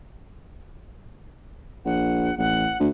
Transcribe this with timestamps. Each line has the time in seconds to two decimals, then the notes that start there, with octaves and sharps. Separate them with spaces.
1.85 A#1 F#5
2.38 A1 F#5
2.79 D2